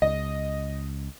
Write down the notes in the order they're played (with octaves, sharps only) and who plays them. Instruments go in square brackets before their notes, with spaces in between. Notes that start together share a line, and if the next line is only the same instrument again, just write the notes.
[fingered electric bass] C#2 [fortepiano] D#5